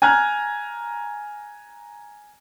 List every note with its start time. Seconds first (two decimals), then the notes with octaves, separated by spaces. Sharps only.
0.02 G#5 A#5 F6 F#6 G#6